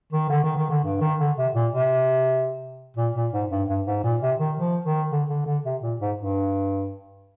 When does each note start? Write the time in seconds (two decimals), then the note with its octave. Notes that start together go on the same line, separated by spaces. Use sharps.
0.12 D#3
0.30 D3
0.43 D#3
0.56 D#3
0.70 D3
0.84 G2
1.01 D#3
1.19 D3
1.37 C3
1.54 A#2
1.73 C3
2.97 A#2
3.15 A#2
3.33 G#2
3.50 G2
3.68 G2
3.86 G#2
4.04 A#2
4.21 C3
4.39 D#3
4.57 F3
4.84 D#3
5.11 D3
5.28 D3
5.46 D3
5.65 C3
5.82 A#2
6.00 G#2
6.18 G2